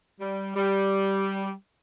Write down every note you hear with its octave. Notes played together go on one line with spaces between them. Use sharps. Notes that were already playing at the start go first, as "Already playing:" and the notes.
G3
G3